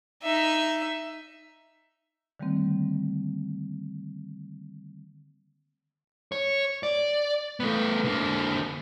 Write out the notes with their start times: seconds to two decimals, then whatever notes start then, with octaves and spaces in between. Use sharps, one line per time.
0.23 D#4 E5
2.40 D3 D#3 G3 A3 A#3 C4
6.32 C#5
6.83 D5
7.60 A3 B3
8.04 D3 A#3